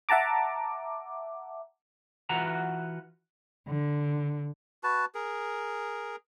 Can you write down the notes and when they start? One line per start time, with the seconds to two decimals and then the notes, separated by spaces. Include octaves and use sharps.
0.09 E5 F#5 A5 A#5 D6
2.29 E3 F4 F#4 B4 F#5 A#5
3.66 D3
4.84 F#4 B4 A5
5.15 G#4 A#4